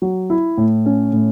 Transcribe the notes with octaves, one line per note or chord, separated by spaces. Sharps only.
F#3
E4
A2
C#4
A2